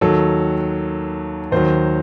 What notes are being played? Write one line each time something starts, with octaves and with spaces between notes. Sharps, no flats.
D#2 D#3 F#3 A4
D#2 D#3 F#3 C5